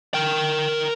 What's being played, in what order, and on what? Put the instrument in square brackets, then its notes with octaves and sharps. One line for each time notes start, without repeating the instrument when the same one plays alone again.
[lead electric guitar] A#4 G5